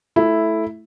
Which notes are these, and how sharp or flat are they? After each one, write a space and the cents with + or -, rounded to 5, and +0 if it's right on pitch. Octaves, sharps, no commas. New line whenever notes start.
A3 -10 E4 +0